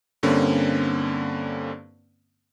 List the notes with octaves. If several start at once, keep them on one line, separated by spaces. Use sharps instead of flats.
G2 D3 A#3 C4 C#4